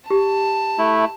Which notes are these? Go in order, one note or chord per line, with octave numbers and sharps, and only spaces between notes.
G4 A5
A3 E4